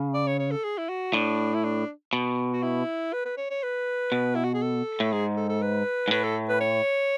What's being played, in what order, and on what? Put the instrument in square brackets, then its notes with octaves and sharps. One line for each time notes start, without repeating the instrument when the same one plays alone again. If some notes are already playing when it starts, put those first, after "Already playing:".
Already playing: [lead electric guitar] C#3
[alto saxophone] D5
C#5
C#5
A4
G#4
E4
F#4
[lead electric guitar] A2 [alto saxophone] D4
[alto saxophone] E4
D4
[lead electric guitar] B2
[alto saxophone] F#4
E4
B4
B4
C#5
C#5
B4
[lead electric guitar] B2
[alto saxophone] E4
F#4
G#4
A4
[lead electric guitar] A2
[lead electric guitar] G#2 [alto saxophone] G#4
[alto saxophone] A4
A4
B4
[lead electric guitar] G#2
[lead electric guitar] A2 [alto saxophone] B4
[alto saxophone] A4
B4
C#5